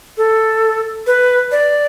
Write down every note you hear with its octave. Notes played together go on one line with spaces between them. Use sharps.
A4
B4
D5